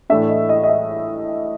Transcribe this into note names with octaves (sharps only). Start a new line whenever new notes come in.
A2 E3 A3 D4 E5
D#5
D#5
D#5
E5